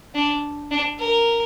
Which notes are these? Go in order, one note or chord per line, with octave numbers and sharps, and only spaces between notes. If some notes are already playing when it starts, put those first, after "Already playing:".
D4
D4
A#4